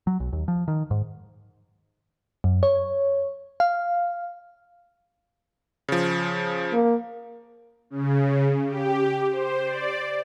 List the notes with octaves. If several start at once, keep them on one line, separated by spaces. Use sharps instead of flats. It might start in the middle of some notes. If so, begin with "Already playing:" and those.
F#3
B1
D#2
F3
D#3
G#2
F#2
C#5
F5
C#3 F3
A#3
C#3
G4
C5
D5